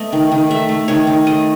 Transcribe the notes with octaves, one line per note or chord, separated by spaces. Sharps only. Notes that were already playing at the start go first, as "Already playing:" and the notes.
Already playing: A3 B3 D#5
D#3
D#3
A3 E5
A3
D#3 C#5
D#3
A3 D#5